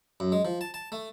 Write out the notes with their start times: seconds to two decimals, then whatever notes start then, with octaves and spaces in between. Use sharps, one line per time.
0.20 F#2
0.32 G#3
0.45 F3
0.61 A5
0.74 A5
0.92 A3